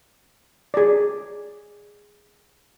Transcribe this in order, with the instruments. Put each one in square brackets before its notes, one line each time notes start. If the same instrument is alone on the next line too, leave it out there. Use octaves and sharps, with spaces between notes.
[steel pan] G#4 D5